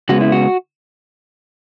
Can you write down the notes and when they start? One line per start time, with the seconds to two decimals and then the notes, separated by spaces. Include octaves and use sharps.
0.09 C#3 G#3 B3 F#4
0.21 E4
0.32 F#4